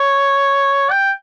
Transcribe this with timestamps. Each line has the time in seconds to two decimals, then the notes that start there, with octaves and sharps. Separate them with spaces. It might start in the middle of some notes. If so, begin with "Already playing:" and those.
Already playing: C#5
0.91 G5